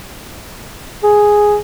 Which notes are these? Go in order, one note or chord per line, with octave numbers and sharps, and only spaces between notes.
G#4